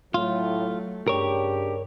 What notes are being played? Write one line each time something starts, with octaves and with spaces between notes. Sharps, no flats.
A2 F#3 A3 F4
G2 C#3 D4 G4 A#4 C#5